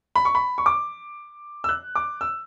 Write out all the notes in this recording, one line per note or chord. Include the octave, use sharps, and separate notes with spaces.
B5
C#6
B5
C#6
D6
E6
F#6
D6
E6